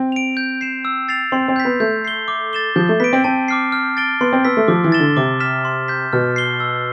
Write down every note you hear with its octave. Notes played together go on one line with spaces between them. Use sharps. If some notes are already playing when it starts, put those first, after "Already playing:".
Already playing: C4
D7 F7
G6
C7 E7
E6
A6 C7 F7
C4 C6
C4
G6 B6
B3
A3 G6
C7 G7
D6
A6 E7 G7
F3 G6
A3
B3 B6 D7
C4
C4 A5
D6 F6 C7
F6
A6 D7 G7
B3 C6
C4
B3 E6 B6
A3
F3 D6
E3
A6 E7 G7
D3
C3 D6
F6 B6 E7
C6
G6 B6
B2 F6
C7 G7
E6